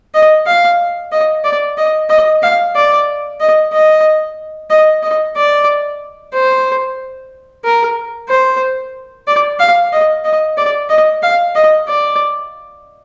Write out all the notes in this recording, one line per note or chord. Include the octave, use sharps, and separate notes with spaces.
D#5
F5
D#5
D5
D#5
D#5
F5
D5
D#5
D#5
D#5
D#5
D5
C5
A#4
C5
D5
F5
D#5
D#5
D5
D#5
F5
D#5
D5